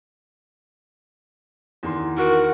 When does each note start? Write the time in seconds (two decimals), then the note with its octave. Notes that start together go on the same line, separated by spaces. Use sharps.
1.83 E2 D#3 C6
2.18 F#4 A#4